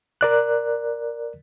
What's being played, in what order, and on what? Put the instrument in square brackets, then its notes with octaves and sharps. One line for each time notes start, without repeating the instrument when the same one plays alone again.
[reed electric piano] A#4 D5 F#6